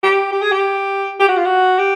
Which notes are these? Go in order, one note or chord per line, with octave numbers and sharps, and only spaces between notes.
G4
G4
G#4
G4
G4
F#4
F4
F#4
G4